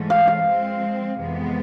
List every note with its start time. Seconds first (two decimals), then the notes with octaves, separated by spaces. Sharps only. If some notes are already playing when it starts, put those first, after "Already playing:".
Already playing: G#2 E3 A3 C#4
0.10 F5
0.28 F5
0.45 F3 G#3 C4
1.17 F2 C3 E3 G#3 B3